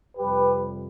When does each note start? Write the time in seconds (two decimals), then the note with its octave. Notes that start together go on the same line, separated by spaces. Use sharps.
0.17 F2 C3 G3 G4 B4